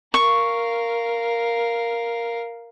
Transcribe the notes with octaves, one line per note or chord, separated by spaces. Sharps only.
A#4 F5 C#6